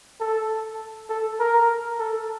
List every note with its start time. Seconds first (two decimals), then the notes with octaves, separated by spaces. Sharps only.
0.20 A4
1.09 A4
1.40 A#4
1.99 A4